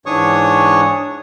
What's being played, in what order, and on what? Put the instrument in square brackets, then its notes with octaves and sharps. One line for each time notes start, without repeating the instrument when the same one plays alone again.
[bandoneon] G#2 E3 D4 C#5 C#6 D#6